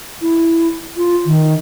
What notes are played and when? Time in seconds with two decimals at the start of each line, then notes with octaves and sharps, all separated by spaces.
0.22 E4
0.97 F4
1.26 D#3